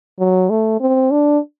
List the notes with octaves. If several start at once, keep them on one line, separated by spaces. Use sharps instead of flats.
F#3
A3
C4
D4